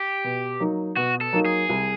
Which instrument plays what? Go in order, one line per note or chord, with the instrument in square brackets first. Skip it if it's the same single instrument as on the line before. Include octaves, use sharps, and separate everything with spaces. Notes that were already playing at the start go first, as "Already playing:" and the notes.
Already playing: [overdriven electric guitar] G4
[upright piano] B2
F#3 A#3 D#4
[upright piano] B2 [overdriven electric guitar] F#4
[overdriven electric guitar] A4
[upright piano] F#3 A#3 D#4
[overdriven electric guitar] G#4
[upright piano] C2